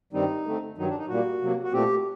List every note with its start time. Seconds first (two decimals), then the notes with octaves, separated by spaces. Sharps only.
0.13 G2 D#3 G3 C4 D#4
0.46 D3 A3 C4
0.78 G2 D#3 F#3 D#4
0.88 D4
0.98 D#4
1.08 A#2 G3 A#3 F#4
1.41 C3 F#3 A#3
1.63 F#4
1.73 A#2 A3 C4 G4